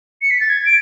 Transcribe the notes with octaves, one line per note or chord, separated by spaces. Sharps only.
C#7
B6
A6
G#6
D7